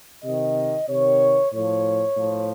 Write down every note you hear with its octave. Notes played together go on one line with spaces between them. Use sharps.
C3 D#3 D#5
C3 D#3 C#5
A2 F3 C#5
A2 F3